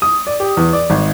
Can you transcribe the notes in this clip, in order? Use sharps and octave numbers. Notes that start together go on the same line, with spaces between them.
D#6
D5
G4
E2
D5
G#1